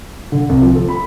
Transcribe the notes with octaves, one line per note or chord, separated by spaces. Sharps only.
D3
C2
F3
A4
B5